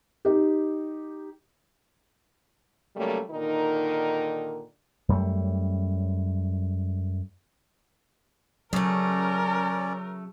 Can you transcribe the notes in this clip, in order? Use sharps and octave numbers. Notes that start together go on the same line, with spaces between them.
D#4 G4
C#3 F#3 G3 A3 A#3
A#2 D3 D#3 D#4 A#4
F#2 G3 A3
C#3 F#3 A3 C#4 A#4 D5